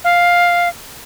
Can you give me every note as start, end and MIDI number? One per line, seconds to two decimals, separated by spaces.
0.04 0.69 77